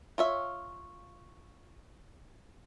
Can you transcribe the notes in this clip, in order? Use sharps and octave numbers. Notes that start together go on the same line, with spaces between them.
F4 C#5 E5